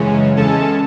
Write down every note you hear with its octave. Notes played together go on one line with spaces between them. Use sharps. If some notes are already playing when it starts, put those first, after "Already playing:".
Already playing: F#2 C#3 E3 G#3 C#4
E2 C#3 G#3 C#4 A4 A5